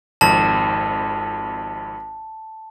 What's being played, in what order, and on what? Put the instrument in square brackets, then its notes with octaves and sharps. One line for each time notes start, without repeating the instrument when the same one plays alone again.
[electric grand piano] G#1 F2 [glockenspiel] A5